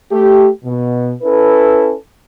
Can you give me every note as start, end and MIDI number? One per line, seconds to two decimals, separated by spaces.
0.12 0.49 57
0.12 0.49 67
0.65 1.14 47
1.23 1.94 61
1.23 1.94 64
1.23 1.94 69
1.23 1.94 71